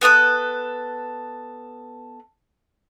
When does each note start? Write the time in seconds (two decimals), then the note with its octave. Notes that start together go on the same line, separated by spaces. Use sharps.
0.01 B3 A4 D#6 F#6